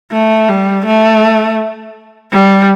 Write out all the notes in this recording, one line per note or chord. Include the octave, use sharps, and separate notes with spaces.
A3
G3
A3
G3